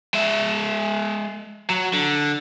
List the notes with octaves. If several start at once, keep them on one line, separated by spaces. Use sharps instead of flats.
G#3 E5
F#3
D3